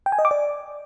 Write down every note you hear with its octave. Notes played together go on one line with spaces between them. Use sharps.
G5
G#5
D#5
D6
D5